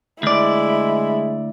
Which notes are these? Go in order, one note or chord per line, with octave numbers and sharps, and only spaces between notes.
D2 G#3 E4 D5